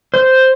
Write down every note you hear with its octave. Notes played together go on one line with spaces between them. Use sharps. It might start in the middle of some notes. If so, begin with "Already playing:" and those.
C5